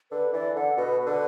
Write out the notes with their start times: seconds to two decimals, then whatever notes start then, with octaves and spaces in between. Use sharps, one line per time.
0.12 D3 B4
0.33 E3 D5
0.56 D3 F#5
0.77 B2 B4
0.99 B4
1.06 D3